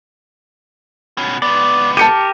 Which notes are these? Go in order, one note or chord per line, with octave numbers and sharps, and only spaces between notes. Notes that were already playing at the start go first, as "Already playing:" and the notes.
B2 C#4
C#2 B3 D5
G4 A#4 A5 C#7 D#7